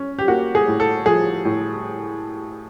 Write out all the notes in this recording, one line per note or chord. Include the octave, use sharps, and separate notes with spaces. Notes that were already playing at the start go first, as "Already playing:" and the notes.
Already playing: C#4
G4
A#3 F#4
G#4
A2
A4
F3 G#4
A2